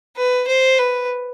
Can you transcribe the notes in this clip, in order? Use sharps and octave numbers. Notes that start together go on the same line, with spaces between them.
B4
C5
B4